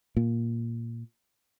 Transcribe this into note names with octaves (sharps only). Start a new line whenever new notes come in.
A#2